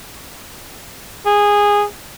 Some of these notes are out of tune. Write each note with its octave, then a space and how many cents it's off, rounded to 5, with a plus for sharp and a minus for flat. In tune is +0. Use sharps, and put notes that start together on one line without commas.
G#4 -15